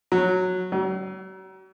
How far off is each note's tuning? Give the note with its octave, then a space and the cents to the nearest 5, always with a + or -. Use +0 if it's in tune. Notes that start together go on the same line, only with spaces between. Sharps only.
F#3 -10
F#3 +40